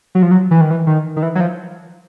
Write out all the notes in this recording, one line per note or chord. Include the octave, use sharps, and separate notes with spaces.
F#3
F3
F#3
E3
D#3
E3
D#3
D#3
E3
F#3
F3